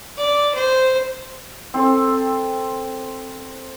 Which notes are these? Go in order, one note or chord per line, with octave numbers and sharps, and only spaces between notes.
D5
C5
C4 A4 C5